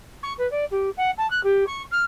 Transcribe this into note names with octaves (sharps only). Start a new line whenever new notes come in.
C#6
B4
D5
G4
F#5
A5
F#6
G4
C#6
F6